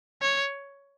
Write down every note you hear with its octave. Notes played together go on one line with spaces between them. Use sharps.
C#5